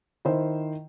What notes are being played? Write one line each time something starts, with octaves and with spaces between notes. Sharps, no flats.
D#3 E4 C5